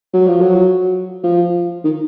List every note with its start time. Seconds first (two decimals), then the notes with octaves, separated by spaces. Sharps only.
0.14 F#3
0.28 F3
0.41 F#3
1.24 F3
1.84 D#3